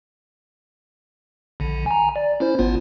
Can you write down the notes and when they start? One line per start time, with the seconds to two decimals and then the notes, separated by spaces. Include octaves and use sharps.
1.60 A#1 D3
1.86 G#5 A#5
2.16 D5
2.40 C#4 E4 C5
2.58 G#1 B3 F4